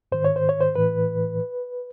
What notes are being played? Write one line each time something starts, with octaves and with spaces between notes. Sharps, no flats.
G#2 D#3 C5
C#5
C5
C#5
C5
A2 E3 B4